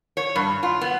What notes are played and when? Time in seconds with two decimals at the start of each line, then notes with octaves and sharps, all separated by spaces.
0.17 C#5
0.36 G2
0.63 F4
0.81 B3